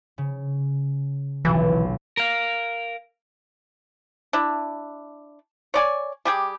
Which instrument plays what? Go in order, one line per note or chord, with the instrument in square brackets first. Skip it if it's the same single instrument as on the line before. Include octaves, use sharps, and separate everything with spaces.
[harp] C#3
[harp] D#1 B1 [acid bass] E3
[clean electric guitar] A#4 F5
[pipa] D4 E4
C#5 D5 G#5
G3 G4 G#4